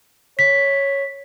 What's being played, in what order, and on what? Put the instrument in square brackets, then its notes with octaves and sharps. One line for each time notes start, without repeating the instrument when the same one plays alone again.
[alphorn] C#5 [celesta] B6